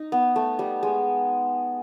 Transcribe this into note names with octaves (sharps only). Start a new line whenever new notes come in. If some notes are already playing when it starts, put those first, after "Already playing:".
Already playing: D#4
B3
A3
G3
G#3